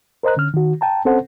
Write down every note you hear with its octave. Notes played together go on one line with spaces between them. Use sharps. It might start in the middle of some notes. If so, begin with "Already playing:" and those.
A#4 C5 D#5 A#5 F#6
D3 C#4 F6
D#3 F#4
G5 A5 A#5
C4 C#4 A4 C5 F#5